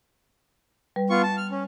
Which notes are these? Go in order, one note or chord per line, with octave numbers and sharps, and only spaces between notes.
G3 B4
B3 F4 C#6
A5
F6
C#4